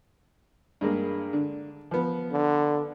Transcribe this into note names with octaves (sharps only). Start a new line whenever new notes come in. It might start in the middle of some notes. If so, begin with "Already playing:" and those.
G2 G#3 A#3
D3
F3 B3
D3